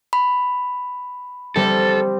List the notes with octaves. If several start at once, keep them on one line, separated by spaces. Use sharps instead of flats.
B5
G3 C4 A4